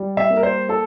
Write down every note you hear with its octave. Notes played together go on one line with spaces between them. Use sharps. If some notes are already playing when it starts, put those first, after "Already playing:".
Already playing: G3
E5
A#3
A#4
C5
A4